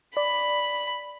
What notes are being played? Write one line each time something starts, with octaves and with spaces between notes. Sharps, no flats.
D5 B5